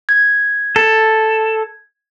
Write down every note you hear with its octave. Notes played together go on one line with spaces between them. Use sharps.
G#6
A4